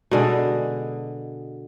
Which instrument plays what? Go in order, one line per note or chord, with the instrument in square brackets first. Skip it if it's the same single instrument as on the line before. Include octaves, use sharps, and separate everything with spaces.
[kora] B2 D3 G#3